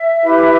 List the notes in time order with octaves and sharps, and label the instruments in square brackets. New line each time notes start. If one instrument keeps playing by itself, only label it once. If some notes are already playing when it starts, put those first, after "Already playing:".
Already playing: [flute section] E5
E4 G4 B4